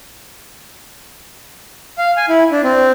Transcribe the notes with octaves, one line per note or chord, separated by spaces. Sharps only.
F5
G#5
E4
D4
C4